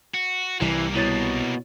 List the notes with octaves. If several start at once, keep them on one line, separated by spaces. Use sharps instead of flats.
F#4
C2 C3 E3 G3 A#3
B2 E4 C#5 A6